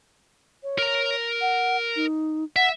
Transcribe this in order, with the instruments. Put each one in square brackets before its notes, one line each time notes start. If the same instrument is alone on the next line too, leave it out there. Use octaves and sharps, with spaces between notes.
[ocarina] C#5
[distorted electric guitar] A#4 A#5
[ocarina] F#5
D#4
[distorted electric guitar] E5 [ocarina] F#5